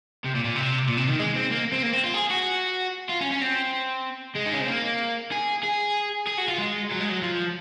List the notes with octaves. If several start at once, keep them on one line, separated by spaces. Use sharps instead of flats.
C3
A#2
A#2
C3
A#2
C3
D#3
G#3
C4
A#3
C4
A#3
C4
F4
G#4
F#4
F4
C#4
C#4
C4
G#3
D#4
C#4
C4
A#3
G#4
G#4
G#4
F#4
F4
G#3
F#3
G#3
F#3
F3